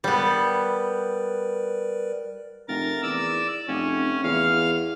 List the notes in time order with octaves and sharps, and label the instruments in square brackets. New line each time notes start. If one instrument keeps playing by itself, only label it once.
[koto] G3 B3 [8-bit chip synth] A#4 B4 D5
[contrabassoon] F1 [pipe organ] A#4 A6
[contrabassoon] E2 [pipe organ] D5 E6
[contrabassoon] F1 [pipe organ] C#4
[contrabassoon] E2 [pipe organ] F5 F6